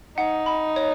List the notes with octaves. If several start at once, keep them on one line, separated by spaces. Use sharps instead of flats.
D#4 F#5
B5
C#5